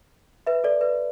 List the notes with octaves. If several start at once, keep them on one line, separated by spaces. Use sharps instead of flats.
B4 E5
A4 D5
B4